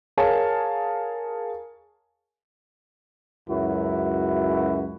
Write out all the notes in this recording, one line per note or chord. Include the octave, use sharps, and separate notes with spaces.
G#4 A#4 C#5 F5 G#5 A5
C#2 F#2 E4 F#4